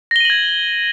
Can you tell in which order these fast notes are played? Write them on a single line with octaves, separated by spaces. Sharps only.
A#6 G7 D#7 F#7 G#6